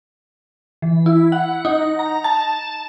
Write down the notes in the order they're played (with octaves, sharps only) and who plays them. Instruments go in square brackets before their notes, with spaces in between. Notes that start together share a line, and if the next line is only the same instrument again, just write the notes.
[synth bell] E3
E4
F#5
D#4
A#5
A5